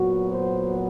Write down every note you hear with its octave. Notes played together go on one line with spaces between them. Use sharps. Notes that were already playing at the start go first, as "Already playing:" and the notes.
Already playing: A#2 F#3 B3 F#4
C5